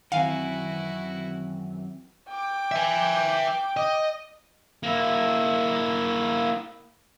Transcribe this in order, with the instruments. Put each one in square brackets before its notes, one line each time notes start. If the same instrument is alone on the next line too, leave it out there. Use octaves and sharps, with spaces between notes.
[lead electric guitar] F#2 G#5 [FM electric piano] D#3 E3 C4 [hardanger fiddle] E4 F#4 [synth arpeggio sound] F5
[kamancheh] G5 D6
[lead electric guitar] E5 G#5
D#5
[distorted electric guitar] A#3 E4